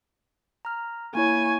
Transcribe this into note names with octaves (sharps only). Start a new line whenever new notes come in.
A#5 F6
A#3 E4 C#5 G#5 C#6